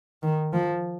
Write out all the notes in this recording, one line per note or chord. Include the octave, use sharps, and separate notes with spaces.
D#3
F3